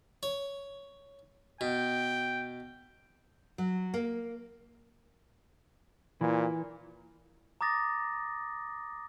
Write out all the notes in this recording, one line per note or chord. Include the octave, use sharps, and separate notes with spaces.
C#5
B2 G5
F#3
A#3
A#2 E3
A#5 D6 D#6 A6 A#6